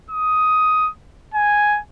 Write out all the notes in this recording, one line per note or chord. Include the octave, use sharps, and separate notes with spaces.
D#6
G#5